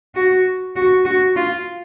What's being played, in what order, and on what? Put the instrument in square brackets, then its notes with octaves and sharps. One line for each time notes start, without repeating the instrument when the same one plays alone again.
[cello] F#4
F#4
F#4
F4